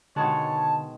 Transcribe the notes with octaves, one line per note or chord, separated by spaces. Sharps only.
B2 D3 D#3 G#3 C#5 A5